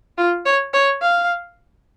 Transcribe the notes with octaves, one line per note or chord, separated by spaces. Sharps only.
F4
C#5
C#5
F5